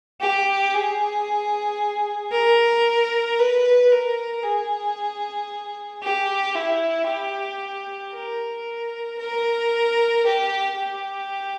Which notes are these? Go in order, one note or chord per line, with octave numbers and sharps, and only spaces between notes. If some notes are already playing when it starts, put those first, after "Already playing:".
G4
G#4
A#4
B4
A#4
G#4
G4
E4
G4
A#4
A#4
G4
G4